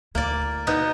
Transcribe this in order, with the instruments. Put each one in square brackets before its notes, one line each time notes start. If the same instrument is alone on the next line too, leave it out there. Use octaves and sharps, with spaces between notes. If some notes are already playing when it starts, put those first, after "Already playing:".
[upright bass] D2 E4 [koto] A#3 D5
[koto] B2 B3 D#4